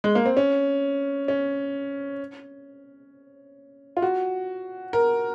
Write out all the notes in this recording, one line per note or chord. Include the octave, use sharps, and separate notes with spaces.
G#3
A#3
C4
C#4
C#4
F4
F#4
A#4